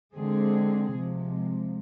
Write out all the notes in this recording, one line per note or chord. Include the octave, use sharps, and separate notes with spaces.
D3 G#3 C4 G#4
C3 F3 G#3